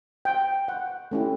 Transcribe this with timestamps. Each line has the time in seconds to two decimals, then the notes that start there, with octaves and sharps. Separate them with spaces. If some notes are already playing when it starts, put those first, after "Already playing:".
0.25 G5
0.68 F#5
1.11 A3 C#4 E4 G4